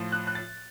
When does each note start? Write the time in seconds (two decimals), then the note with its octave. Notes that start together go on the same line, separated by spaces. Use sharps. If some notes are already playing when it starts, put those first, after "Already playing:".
Already playing: A2 F3
0.12 F#6
0.27 F#6
0.35 A6